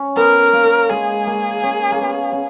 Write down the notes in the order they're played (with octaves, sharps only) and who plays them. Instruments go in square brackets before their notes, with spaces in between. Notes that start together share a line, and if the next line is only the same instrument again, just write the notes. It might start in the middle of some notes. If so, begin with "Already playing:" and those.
Already playing: [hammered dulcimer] C#4
[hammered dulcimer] B3 [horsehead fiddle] A#4
[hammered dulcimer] A#3
[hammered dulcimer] G#3 [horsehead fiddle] G#4
[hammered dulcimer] A#3
C#4
A#3
B3
C#4